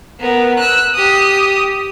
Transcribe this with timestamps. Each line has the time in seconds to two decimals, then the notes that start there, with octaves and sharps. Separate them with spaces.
0.20 B3 A#4
0.59 E6 F#6
0.94 G4 D#6